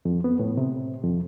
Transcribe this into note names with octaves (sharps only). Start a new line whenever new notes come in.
F2
B3
A2
C3
F2